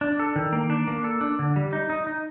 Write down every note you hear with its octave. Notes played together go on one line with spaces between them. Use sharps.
D4
A4
D#3
A#3
D4
A#3
A4
D4
D3
G3
D#4
D#4
D#4